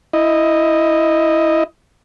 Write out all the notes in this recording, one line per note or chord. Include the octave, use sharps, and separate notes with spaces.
E4 D#5